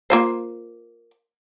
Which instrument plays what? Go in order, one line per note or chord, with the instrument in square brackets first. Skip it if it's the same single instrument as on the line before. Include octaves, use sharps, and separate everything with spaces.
[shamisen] A#3 F4 C5